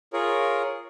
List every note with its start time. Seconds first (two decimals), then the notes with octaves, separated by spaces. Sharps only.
0.13 F4 G#4 A#4 C#5